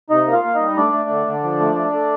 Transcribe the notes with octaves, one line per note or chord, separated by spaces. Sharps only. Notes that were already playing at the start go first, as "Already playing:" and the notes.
C3 D#4 D#5
A#3
F4 F5
A#3
D#4 D#5
G3
A3 D4 D5
A3
D3
D3
F3
A3
A3
A3